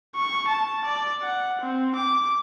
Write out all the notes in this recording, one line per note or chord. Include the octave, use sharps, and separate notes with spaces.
C#6
A5
D5
F#5
C4
D6